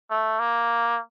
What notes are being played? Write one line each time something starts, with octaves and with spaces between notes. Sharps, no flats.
A3
A#3